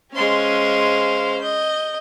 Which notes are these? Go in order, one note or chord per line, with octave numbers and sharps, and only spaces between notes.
G#3 C#4 C5 F5 C6
D#5 G6